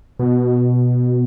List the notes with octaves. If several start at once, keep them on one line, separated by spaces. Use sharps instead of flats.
B2